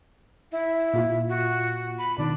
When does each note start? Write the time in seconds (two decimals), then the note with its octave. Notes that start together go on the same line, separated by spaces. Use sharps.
0.52 E4
0.93 A#2 F4
1.29 F#4
1.99 B5
2.18 B2 D#3 D4